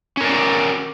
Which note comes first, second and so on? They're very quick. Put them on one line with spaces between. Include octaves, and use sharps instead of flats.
C#4 A#4 D5